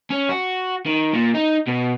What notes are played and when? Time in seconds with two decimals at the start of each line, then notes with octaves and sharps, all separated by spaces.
0.10 C#4
0.29 F#4
0.86 D#3
1.14 A#2
1.35 D#4
1.68 B2